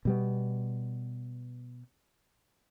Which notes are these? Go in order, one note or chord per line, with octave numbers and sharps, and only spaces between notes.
B2 G3 B3